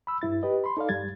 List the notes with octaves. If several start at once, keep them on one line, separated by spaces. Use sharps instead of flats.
B5 E6
G2 E4 A6
G4 B4 D#5
B5 C6
D#4 A4 D5 F5
G2 G3 G#6 A6